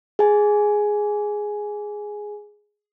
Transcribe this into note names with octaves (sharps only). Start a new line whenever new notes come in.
G#4 G#5